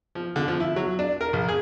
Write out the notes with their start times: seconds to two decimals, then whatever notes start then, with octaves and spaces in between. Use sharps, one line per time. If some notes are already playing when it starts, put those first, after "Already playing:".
0.15 F3
0.36 D3
0.48 F3
0.60 E4
0.76 F#3
0.99 D4
1.21 A#4
1.33 A#1
1.49 G#4